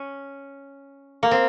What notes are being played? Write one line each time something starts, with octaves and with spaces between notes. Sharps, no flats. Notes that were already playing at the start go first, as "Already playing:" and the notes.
Already playing: C#4
A#3
C4